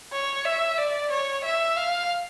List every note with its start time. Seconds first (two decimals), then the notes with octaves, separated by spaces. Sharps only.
0.12 C#5
0.45 E5
0.78 D5
1.11 C#5
1.44 E5
1.77 F5